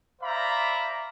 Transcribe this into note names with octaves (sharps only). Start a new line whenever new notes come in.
C5 D5 E5 F5 A#5 B5